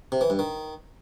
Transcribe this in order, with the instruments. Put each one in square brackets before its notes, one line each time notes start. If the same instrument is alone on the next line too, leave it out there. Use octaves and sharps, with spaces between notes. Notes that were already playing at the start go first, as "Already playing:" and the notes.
[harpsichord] C3
E3
G2
D#3